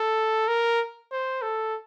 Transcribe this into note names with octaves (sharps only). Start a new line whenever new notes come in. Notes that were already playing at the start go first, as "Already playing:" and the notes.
Already playing: A4
A#4
C5
A4